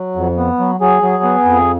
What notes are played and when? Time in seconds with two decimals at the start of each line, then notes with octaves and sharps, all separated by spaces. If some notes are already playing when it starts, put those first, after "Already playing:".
Already playing: F#3
0.16 F2
0.37 B3
0.59 F#3
0.80 F#3 G#4
1.02 F#3
1.23 B3
1.45 F2